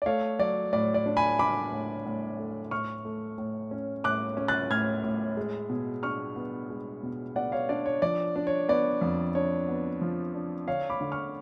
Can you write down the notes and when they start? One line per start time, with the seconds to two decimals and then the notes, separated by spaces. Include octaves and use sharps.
0.02 D5
0.06 A3 C#5 F5
0.39 F#3 D5
0.73 A2 D5
0.94 D5
1.06 D4
1.17 G#5 B5
1.39 D4 B5 D6
1.72 A2
2.05 A2
2.39 A3
2.71 A2 C#6 F6
3.05 A3
3.38 A2
3.71 C#4
4.04 A2 D6 F#6
4.37 C#4
4.48 F#6 A6
4.70 A2 F6 G#6
5.03 A2
5.37 G#3
5.70 B2
6.03 D4 C#6 F6
6.36 B3
6.70 G#3
7.03 B2
7.36 B3 D5 F#5
7.52 C#5 F5
7.69 D4 D5
7.86 C#5
8.02 F3 D5
8.36 D4
8.47 C#5
8.69 B3 D5
9.01 F2
9.35 D4 C#5
9.68 B3
10.01 F3
10.35 D4
10.67 D3 C#5 F5
10.90 B5 D6
11.01 D3
11.12 C#6 F6